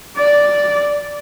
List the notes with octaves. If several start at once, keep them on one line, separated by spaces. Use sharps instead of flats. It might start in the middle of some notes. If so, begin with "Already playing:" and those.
D5